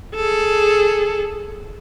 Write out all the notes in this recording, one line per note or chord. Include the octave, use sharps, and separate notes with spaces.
G#4 A4